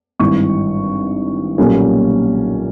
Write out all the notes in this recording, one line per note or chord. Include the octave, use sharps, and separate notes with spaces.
G#1 G2 E3 C#6
B1 A#2 G3 A#3 C#4